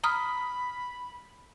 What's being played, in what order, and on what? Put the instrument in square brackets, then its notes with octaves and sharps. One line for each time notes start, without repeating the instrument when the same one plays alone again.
[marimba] A#5 D#6 F6 [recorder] B5